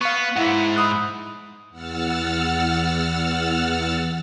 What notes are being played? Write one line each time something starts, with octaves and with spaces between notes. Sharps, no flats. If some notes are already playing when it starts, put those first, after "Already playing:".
B3 F5 C#6
G#2 E4 F#5
B5 D#6 F#6
E2 F#5 E6 F6 A6